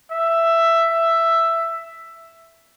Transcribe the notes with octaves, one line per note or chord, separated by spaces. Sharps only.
E5
E5